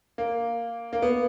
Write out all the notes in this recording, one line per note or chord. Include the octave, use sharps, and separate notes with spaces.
A#3
A#3
B3